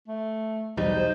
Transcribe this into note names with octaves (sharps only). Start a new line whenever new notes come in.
A3
B1 E2 G3 D#4 C5